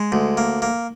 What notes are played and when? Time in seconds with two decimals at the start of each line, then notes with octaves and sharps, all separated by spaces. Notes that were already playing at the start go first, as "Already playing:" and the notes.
Already playing: G#3
0.12 D2
0.37 A#3
0.62 A#3